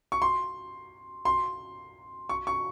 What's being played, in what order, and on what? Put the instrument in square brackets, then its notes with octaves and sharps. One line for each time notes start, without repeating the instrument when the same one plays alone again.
[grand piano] C#6
C6
C6
C#6
C#6